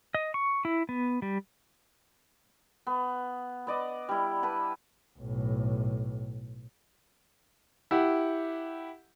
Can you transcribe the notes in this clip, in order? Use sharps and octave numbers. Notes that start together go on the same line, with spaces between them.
D#5
C#6
E4
B3
G3
B3
B3 D5 D#5
G3 E4
B4 A5 B5
B1 A2
E4 G4 F#5